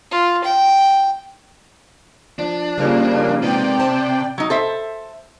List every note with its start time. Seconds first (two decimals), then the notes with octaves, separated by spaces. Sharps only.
0.11 F4
0.44 G5
2.39 F3 D4
2.78 C#3 F3 G3 A#3
3.42 C3 G#3 B3 D#4 D5 G5
3.80 C5 E5 A5
4.38 F#3 D#4
4.50 A4 C5 E5